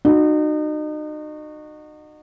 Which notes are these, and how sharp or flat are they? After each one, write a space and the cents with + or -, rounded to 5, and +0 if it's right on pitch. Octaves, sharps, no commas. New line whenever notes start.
D#4 -35 F#4 -5